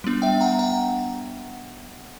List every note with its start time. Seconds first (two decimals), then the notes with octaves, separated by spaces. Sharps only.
0.04 G3 B3 D4
0.22 E5 G5
0.41 F#5 A#5
0.59 F#5 A#5